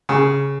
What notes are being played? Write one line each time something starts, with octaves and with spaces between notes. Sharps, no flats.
C#3